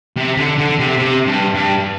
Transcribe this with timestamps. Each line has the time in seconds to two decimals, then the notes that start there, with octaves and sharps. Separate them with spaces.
0.17 C3
0.37 D3
0.58 D3
0.79 C3
0.98 C3
1.26 G2
1.54 G2